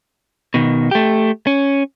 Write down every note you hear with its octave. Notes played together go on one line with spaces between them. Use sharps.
B2 D#3
A3 G4
C#4